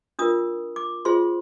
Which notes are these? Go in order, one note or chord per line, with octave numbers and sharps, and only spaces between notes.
D4 F4 A#4 D#6
D6
F4 G#4 C5 C6